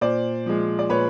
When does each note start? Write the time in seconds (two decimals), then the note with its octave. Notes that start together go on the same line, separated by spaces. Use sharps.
0.01 A#2 C5 D5
0.46 F3 G#3
0.79 D5
0.90 A#2 B4 C#5